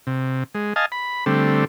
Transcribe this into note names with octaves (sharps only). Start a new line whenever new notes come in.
C3
G#3
D#5 F5 G#5 A5
B5
D3 G3 A3 C4